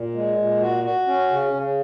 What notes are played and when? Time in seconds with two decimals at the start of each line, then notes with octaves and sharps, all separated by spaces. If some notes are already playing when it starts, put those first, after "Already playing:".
Already playing: A#2
0.14 G#3
0.37 A#2
0.60 F#4
0.84 F#4
1.07 C#4
1.31 C#3
1.54 C#3